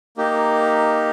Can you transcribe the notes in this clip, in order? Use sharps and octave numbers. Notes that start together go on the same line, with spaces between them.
A#3 D#4 G4